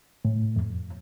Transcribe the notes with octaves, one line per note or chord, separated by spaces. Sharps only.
A2
F2